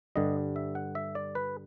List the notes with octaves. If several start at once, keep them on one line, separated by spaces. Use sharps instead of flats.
G2 D3 G3 D#5
E5
F#5
E5
D5
B4